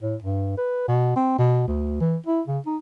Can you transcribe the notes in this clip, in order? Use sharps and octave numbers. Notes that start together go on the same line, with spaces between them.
A2
G2
B4
B2
C4
B2
D2
E3
E4
C#3
D#4